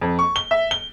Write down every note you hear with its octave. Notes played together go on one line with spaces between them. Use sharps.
F2
C#6
G7
E5
G7